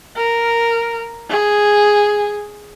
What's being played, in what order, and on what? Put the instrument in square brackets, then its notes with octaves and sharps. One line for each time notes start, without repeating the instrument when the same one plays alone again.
[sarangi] A#4
G#4